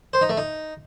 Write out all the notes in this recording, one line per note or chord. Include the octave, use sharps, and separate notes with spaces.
C5
D#4
A3
D#4